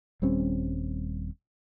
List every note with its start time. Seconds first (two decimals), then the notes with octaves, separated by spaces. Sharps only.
0.22 D#1 G3 C4 C#4